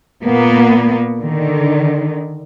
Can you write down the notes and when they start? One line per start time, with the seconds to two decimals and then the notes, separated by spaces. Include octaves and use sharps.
0.24 A#2 A#3 B3
1.20 D3 D#3